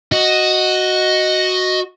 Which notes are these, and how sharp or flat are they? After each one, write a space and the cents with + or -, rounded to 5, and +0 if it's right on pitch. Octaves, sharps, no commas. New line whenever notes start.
F#4 +0 D#5 +0